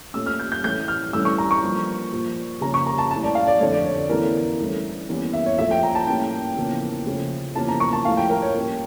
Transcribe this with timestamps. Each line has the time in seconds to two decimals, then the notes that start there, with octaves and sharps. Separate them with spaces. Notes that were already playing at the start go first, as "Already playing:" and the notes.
0.14 A#2 A3 C#4 E6
0.26 F6
0.39 G6
0.52 G6
0.64 A2 E3 A3 C#4 G6
0.88 F6
1.13 G2 E3 A3 C#4 E6
1.25 C#6
1.38 A#5
1.51 C#6
1.63 G2 F3 A#3
2.12 A#2 F3 A#3
2.61 C#3 F3 A#3 C#4 A#5
2.74 C#6
2.86 A#5
2.98 A5
3.11 A2 G3 C#4 A5
3.24 D5
3.35 F5
3.47 D5
3.60 F2 D3 F3 A3 C#5
3.72 D5
3.85 C#5
4.09 E2 E3 A3 C#4 A#4
4.59 G2 E3 A3 C#4
5.09 E2 E3 G3 A#3 C#4
5.33 E5
5.46 C#5
5.58 A#2 F3 A3 C#4 E5
5.71 G5
5.83 A#5
5.95 A5
6.07 A2 G3 A#3 C#4 G5
6.57 E2 C#3 F3 A#3 C#4
7.06 C#3 F3 A3 C#4
7.56 E2 C#3 F3 A#3 C#4 A5
7.68 A#5
7.80 C#6
7.93 A5
8.05 A2 F3 A3 F5
8.17 G5
8.30 A#4
8.42 C#5
8.54 A#2 G3 C#4